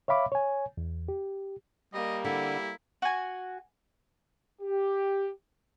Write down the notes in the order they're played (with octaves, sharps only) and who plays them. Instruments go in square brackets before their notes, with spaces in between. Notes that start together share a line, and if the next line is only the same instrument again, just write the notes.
[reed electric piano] C#5 E5 F5 B5 D6
C#5 G#5
E2
G4
[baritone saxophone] G3 [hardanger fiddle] A#3 [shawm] D#5
[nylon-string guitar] D3 [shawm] E4
[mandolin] F#4 G#5
[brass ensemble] G4